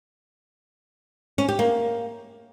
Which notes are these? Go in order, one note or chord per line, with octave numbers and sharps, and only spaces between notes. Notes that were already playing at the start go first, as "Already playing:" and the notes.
C#4
G4
A#3